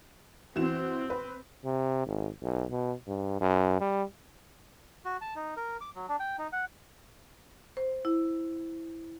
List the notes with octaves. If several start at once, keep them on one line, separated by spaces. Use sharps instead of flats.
E3 C4 F#4 E7
B4
C3
G#1
B1
B2
G2
F#2
G3
F#4
A5
D#4
A#4
D6
F#3
D4
G5
D#4
F#5
C5
E4